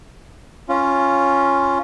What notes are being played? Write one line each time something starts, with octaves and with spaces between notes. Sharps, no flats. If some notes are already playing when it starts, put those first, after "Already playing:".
C#4 F4